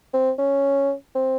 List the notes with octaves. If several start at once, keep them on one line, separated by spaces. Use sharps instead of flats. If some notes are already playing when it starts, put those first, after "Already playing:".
C4
C#4
C4